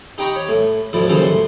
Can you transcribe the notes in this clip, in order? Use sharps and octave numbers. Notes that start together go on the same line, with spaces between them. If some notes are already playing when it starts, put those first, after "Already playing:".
D#4 G4 G5 A#5 B5 C#6
C#5
A2
D2 A2 F3 E4 D5
D#2 C#3 F#3 A4 C5
A2 C6